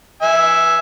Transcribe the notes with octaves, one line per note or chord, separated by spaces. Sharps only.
E5 G#5